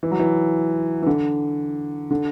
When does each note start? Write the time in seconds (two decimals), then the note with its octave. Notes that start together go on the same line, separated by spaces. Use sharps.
0.03 E3
0.11 F#3
0.20 E3
1.02 E3
1.06 D3
2.11 D3